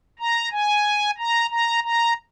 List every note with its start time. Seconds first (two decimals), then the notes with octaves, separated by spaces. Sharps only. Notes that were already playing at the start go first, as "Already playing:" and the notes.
0.19 A#5
0.52 G#5
1.18 A#5
1.50 A#5
1.83 A#5